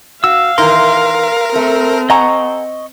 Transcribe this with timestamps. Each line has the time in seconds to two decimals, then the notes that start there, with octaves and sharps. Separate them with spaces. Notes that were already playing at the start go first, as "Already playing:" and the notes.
0.24 F#4 F5 E6
0.58 D#3 E3 A#4 C6
1.56 A3 C4
2.10 D#5 F#5 G#5 A#5 C#6